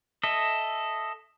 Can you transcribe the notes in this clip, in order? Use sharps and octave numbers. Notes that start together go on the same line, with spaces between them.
A4 D#5 E5